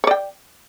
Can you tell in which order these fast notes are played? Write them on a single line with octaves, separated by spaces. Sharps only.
C#5 D5 G5